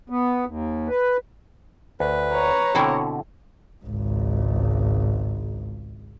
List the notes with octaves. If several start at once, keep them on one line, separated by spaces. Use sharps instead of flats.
B3
D#2
B4
D2 B4
C#5 A#5
B2 D3 C4 E4 A4
G#1 C#2